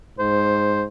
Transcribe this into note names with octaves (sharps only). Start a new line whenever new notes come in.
G#2 C5